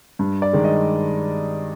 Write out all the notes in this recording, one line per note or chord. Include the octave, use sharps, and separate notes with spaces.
G2
D5
D#3 G#3
D#5